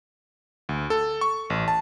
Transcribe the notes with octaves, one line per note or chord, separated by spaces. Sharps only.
D2
A4
C#6
A1
A5